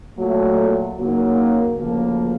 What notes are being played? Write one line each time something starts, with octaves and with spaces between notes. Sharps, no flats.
A#2 F#3 A3
C#3 F#3 A#3 D#4
D2 C#3 F3 A#3